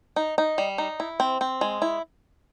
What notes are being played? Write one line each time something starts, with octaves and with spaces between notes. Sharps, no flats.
D#4
D#4
G3
D#4
E4
C4
C4
G#3
E4